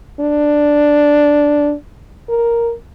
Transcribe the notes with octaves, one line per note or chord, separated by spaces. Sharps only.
D4
A#4